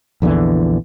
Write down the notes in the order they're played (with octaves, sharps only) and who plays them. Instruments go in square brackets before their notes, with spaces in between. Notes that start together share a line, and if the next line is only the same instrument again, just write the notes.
[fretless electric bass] A#1 E2 D3 E3